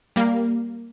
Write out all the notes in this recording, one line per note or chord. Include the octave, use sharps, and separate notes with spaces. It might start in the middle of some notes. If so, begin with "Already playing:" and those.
G3 A#3